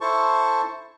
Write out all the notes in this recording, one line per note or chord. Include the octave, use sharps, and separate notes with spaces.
E4 A4 C5 A5 C#6